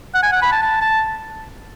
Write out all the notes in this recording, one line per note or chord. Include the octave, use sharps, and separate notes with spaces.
F#5
G#5
F#5
B5
A5
A5
A5